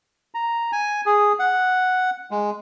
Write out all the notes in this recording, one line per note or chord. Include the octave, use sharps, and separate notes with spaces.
A#5
G#5
G#4
F#5
G#3